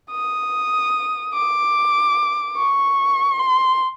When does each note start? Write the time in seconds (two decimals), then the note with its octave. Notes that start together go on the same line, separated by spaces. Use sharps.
0.11 D#6
1.34 D6
2.57 C#6
3.39 C6